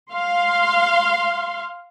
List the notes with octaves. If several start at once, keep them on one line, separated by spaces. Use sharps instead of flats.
F5 C6